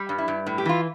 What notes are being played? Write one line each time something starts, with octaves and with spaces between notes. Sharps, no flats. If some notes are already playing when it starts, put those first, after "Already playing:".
Already playing: G3
G2
E4
G2
A2
G4
E3 F4